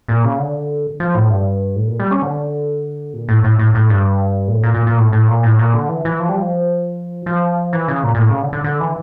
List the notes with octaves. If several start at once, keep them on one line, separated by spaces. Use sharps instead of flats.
A#2
C#3
D3
F3
A2
G2
A2
A#2
G3
C#4
D3
A#2
A2
A2
A2
A2
G2
A#2
A2
A#2
A#2
A#2
A2
A2
A#2
A2
A#2
D3
E3
E3
F3
G3
F3
F3
E3
C#3
A#2
A#2
A2
C#3
D3
D3
D3
E3